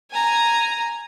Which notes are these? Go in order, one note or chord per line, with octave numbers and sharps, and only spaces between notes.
G#5 A#5